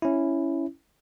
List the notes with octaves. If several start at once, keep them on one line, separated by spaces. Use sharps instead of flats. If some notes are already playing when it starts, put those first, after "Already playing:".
C#4 E4